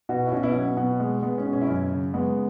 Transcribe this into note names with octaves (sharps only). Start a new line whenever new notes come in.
B2 F#4 B4
E4
B2 C#4 F#4
B3 E4
F#3 C#4
B3
B2 B3
G#3
G#3 B3
C#4
B2
C#4
E4
F#2 C#4
C#3
G#3 B3